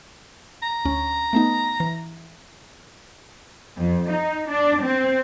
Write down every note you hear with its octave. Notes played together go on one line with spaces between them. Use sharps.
A#5
D2 C#4
A3 B3 D#4
E3
F2
D#4
D4
C4